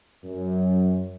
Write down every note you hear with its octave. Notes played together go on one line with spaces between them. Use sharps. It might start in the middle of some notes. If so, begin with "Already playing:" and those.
F#2